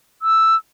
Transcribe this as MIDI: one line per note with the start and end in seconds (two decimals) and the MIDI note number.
0.22 0.56 88